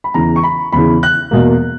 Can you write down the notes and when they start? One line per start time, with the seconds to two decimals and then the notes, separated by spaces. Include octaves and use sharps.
0.04 B5
0.14 E2 C#3 E3 A#5
0.36 C#6
0.43 B5
0.72 E2 C#3 E3 B5
1.03 F#6
1.31 E2 B2 A#3